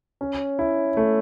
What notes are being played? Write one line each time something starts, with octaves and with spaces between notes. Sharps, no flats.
C#4
E4
A3